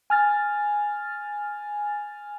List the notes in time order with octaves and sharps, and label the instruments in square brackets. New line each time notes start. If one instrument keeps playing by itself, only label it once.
[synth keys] G#5 F6 A6